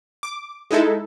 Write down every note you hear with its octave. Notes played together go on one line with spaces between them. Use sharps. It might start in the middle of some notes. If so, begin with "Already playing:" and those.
D6
G#3 D#4 E4 A4